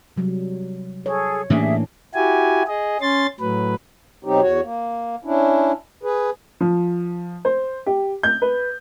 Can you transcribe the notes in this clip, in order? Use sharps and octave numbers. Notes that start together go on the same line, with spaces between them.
C3 F#3 G3
G#4 A4 C#5
A2 E3 A#3 C#4 D4 G4 G#4 E5
E4 F#4 G4 G#5
G#4 D#5
C#4 C6 A6
A2 F#3 B4
B2 F#3 C4 D#4 G4
E2 F#4 C#5
A#3
C#4 D4 E4
G#4 B4
F3
C5
G4
G6
B4